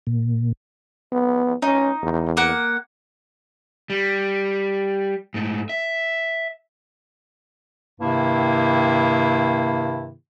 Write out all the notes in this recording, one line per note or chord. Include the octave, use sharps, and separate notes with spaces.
A#2
B3
C#4 D#4
E2
A#3 F#5
G3
G#2 A3
E5
G2 C3 D#3 A#3 E4